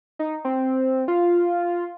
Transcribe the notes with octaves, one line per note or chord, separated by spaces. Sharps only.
D#4
C4
F4